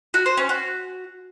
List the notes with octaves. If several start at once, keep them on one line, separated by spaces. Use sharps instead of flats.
F#4
C5
C#4
F#4